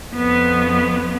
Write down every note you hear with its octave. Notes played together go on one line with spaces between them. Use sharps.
F2 B3